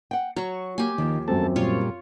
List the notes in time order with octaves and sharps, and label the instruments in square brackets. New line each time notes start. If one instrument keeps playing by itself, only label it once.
[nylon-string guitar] F#5 G5
[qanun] F#3 C#6 [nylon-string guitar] F#4 C#5
[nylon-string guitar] A#3 [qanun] G4 G#5
[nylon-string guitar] D#2 F3 [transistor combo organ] D#3
[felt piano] F#2 C4 [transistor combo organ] A3 A4 A5
[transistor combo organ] A#2 G3 [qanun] F4 C#5